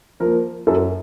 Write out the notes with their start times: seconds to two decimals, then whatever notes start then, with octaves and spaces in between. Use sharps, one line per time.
0.20 F3 A#3 A#4
0.67 F#2 A4